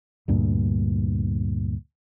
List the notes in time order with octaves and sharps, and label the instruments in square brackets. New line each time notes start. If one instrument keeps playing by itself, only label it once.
[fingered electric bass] D2 G2 A#2